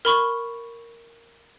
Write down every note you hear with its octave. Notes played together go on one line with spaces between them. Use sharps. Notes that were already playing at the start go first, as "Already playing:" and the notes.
A#4 B5 C#6 G7